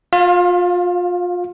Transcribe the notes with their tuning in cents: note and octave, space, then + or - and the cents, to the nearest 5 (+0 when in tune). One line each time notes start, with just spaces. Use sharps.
F4 +30 F5 +0